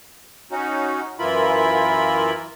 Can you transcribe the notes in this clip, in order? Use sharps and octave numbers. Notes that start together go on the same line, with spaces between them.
C#4 D#4 F#4
F#2 E3 E4 F4 A#4 B5